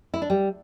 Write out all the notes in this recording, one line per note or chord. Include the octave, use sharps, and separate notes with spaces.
E4
D4
G3